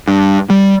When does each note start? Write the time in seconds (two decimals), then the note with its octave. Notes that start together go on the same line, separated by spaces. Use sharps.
0.08 G2
0.50 G3